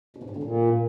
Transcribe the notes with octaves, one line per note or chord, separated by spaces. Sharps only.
B2
G#2
G2
D3
A#2